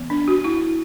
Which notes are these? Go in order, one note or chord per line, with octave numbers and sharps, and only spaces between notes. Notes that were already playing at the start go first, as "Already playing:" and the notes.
Already playing: E3 B3
D4
F#4
E4